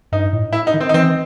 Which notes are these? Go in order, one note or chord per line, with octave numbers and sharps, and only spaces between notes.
G2 D#4
A2
E4
D#4
D#3
C4
D#4
E3 C4